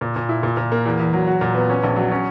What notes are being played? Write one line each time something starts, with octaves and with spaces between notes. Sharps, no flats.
A#2
A#2
E4
A#2
A#2
A#3
E2
E2
F#3
F#4
A#2
B3
C#4
A#1
F#3
C#4